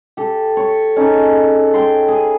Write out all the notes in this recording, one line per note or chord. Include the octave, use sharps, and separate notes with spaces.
G4 A4
C#5
C#4 D#4 G#4 A4
G5 C6
G#4